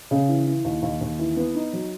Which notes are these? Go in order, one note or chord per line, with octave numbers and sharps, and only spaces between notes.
C#3
E3
E3
D#2
D#2
D#2
E3
B3
D#4
F#3